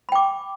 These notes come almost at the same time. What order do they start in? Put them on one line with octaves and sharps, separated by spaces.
B5 G5 D6